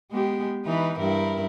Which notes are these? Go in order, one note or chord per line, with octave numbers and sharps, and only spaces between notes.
G#3 B3 G4
E3 D#4 B4
G2 E4 A#4